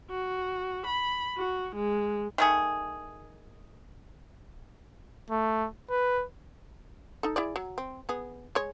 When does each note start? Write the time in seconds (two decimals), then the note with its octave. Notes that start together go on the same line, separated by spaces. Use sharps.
0.10 F#4
0.86 B5
1.37 F#4
1.76 G#3
2.38 D#3 A3 G#4
5.31 A3
5.90 B4
7.23 D#4 A4
7.36 E4 G#4 D5
7.56 F#3
7.78 C4
8.09 B3 G#4
8.55 G#3 C#5